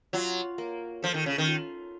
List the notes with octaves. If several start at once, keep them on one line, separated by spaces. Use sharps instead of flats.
F#3 F4
A#3
F3 A4
D#3
C#3
D#3
F4